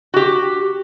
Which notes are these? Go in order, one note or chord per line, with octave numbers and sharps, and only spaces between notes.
F#4 G4